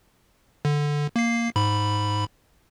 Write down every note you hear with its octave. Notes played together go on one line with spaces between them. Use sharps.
D3
A#3 C7
G#2 B5